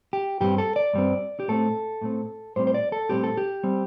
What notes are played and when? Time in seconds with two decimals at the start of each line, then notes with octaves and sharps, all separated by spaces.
0.13 G4
0.41 G2 G3 C4 G4
0.58 A4
0.76 D5
0.93 G2 G3 C4
1.40 G4
1.48 A2 A3 C4 A4
2.01 A2 A3 C4
2.56 A2 G3 C4 C5
2.67 C5
2.74 D5
2.92 A4
3.09 A2 G3 C4 G4
3.23 A4
3.37 G4
3.63 G3 C4